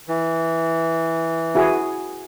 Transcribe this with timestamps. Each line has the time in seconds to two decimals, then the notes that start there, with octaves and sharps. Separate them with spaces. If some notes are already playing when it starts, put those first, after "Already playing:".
0.09 E3
1.55 E4 F#4 G#4